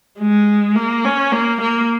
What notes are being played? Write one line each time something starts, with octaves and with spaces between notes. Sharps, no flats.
G#3
A#3
C#4
A#3
A#3